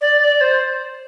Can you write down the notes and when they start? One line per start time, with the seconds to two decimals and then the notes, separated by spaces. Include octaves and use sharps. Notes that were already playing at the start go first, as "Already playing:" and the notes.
0.01 D5
0.20 D5
0.40 C5